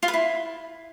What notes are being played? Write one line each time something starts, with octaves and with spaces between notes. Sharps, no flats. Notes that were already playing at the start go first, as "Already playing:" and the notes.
F4
B4
E4